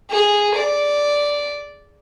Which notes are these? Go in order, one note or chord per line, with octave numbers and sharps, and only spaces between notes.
G#4
D5